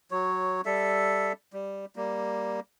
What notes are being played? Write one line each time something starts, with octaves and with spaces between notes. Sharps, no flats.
F#3 C#5
G3 A4 E5
G3
G3 A#3